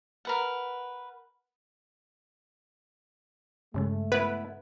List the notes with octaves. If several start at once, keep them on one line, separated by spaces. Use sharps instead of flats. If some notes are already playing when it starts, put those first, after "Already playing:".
A#4 B4 F#5
G2 C#3 G#3 A3
B3 E4 B4